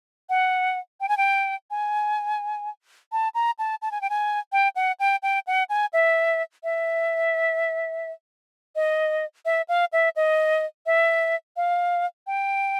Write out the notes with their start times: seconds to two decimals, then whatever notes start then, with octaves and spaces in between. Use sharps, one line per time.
0.29 F#5
1.00 G5
1.08 G#5
1.17 G5
1.71 G#5
3.12 A5
3.35 A#5
3.59 A5
3.82 A5
3.91 G#5
4.01 G5
4.10 G#5
4.52 G5
4.76 F#5
5.00 G5
5.23 G5
5.47 F#5
5.69 G#5
5.93 E5
6.63 E5
8.75 D#5
9.45 E5
9.68 F5
9.93 E5
10.16 D#5
10.86 E5
11.57 F5
12.27 G5